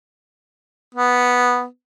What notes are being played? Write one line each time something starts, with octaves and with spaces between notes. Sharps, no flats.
B3